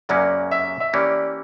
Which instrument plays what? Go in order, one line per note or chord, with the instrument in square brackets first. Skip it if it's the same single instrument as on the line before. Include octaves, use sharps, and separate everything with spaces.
[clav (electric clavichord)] F#2 C#3 F#3 A#3 C#4 [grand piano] D5
[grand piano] E5
E5
[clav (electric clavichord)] E3 A#3 C#4 G4 [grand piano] D5